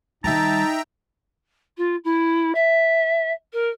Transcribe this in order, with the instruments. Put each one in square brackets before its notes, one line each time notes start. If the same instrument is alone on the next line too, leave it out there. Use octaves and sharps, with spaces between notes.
[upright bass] D#3 G3 [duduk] D#4 [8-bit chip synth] E5 G5 A#5 [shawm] A5
[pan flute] F4
E4
E5
A#4